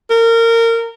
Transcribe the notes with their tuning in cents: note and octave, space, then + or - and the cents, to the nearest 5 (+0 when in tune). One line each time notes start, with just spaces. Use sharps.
A#4 -25